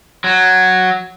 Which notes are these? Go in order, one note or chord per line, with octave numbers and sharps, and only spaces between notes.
F#3